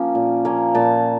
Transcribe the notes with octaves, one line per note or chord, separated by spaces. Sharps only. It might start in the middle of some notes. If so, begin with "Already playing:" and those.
Already playing: F3 A#3 C#4
A#2
F3 A#3 C#4
A#2 A5